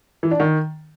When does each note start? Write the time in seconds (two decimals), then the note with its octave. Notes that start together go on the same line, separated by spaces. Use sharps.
0.23 E3
0.31 D4
0.40 D#3